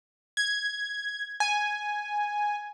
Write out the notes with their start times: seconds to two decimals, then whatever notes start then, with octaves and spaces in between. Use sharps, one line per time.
0.37 G#6
1.40 G#5